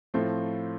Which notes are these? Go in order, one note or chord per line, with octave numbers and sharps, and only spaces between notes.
A2 F3 A3 C4 F4